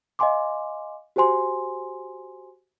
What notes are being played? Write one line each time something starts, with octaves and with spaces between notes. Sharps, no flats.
D#5 F5 G#5 C6 D6
F#4 G4 C5 G#5 C6